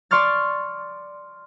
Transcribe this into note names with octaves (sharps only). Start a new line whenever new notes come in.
D5 C6 C#6 F6 A6